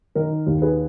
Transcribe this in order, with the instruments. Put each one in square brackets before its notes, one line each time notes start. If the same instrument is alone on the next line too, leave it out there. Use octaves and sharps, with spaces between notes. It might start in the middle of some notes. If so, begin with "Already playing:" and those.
[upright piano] D#3 A#4
D#2
G#4 B4